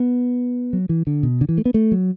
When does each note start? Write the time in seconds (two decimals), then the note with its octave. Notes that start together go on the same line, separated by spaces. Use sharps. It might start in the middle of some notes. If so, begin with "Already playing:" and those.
Already playing: B3
0.73 F#3
0.89 E3
1.07 D3
1.23 B2
1.41 D3
1.49 E3
1.58 A3
1.65 B3
1.74 A3
1.92 F#3